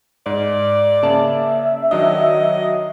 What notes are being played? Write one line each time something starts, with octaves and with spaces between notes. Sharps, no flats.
G#2 D5
C#3 A#3 E5 A5
D#3 F#3 D4 D#5